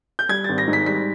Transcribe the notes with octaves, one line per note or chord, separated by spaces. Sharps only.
G6
G3 G#6
G#1 A6
A#6
G#2
B6
G3 B6